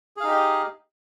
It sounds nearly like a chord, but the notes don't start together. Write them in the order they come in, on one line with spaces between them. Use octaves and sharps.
G#4 F5 D#4 G4 D#5